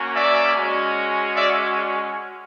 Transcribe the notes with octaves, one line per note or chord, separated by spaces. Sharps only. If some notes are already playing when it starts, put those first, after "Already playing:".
Already playing: A#3 C#4 F#4
D5 E5
G#3 C#4 F#4
D5 E5